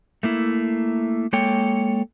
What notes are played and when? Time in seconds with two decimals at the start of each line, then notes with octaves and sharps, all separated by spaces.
0.23 A3 A#3 E4
1.33 G#3 A#3 A4 C#5 G5